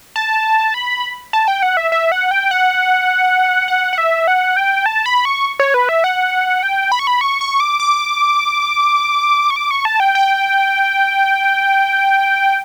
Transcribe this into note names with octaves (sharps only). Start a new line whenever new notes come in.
A5
B5
A5
G5
F#5
E5
E5
F#5
G5
F#5
F#5
F#5
E5
F#5
G5
A5
B5
C#6
C#5
B4
E5
F#5
G5
B5
C#6
B5
C#6
C#6
D6
D6
C#6
D6
C#6
A5
G5
G5